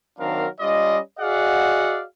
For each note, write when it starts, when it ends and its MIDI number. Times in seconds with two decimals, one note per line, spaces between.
0.19 0.46 51
0.19 0.46 54
0.19 0.46 60
0.19 0.46 62
0.19 0.46 70
0.19 0.46 77
0.60 0.99 55
0.60 0.99 61
0.60 0.99 65
0.60 0.99 74
0.60 0.99 75
1.19 2.03 66
1.19 2.03 68
1.19 2.03 74
1.19 2.03 75
1.19 2.03 77
1.19 2.03 78